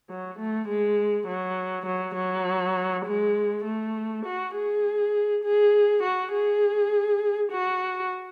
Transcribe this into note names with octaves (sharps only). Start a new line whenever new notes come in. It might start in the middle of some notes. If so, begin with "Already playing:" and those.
F#3
A3
G#3
F#3
F#3
F#3
G#3
A3
F#4
G#4
G#4
F#4
G#4
F#4